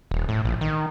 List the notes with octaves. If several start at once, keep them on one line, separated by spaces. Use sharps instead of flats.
D#1
A2
A#1
D#3